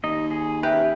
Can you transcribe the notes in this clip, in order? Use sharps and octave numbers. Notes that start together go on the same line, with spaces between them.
D#2 D#4 D#5
G#4
C#4 G4 A#4 B4 E5